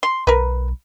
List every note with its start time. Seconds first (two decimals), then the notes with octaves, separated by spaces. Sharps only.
0.03 C6
0.27 B1 A#4 B4